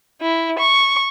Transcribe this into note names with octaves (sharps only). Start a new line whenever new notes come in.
E4
C#6